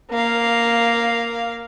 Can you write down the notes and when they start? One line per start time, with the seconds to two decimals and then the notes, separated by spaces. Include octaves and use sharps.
0.11 A#3 F5